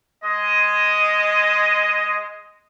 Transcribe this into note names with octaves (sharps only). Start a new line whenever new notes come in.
G#3 D#5